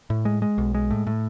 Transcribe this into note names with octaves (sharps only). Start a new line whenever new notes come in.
A2
G#3
G#3
B1
G#3
A2
A2